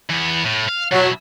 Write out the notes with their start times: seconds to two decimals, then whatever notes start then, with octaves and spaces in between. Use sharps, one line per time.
0.09 E3 B3
0.44 A2
0.69 F5
0.92 B2 F#3 E4